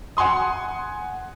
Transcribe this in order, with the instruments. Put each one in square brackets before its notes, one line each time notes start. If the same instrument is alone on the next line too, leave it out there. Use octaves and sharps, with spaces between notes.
[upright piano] F#5 G#5 C6 D#6